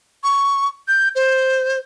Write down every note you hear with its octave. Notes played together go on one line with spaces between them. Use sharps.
C#6
G6
C5